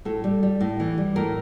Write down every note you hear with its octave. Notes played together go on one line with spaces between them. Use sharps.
A2 A4
G3
G3
A2
E3
G3
A2 A#4